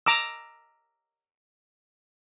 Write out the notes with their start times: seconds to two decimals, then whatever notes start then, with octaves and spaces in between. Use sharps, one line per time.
0.06 A#5 D6 E6